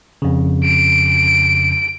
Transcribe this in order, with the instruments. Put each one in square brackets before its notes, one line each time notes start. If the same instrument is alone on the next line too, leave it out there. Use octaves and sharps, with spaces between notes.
[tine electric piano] F2 C#3
[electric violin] D7